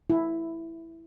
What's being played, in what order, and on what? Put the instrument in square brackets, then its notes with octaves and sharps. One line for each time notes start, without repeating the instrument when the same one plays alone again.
[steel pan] E4